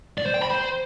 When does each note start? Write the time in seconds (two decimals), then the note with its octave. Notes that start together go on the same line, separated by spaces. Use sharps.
0.18 D5
0.26 C5
0.34 G5
0.42 B5
0.50 C5